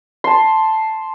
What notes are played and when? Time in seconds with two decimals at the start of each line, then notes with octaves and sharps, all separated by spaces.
0.24 A5 C6